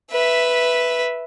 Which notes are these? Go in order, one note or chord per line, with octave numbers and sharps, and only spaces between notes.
B4 E5